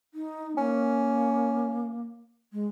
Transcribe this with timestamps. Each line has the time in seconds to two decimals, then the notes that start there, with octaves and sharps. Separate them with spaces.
0.14 D#4
0.57 A#3 C#4
2.53 G#3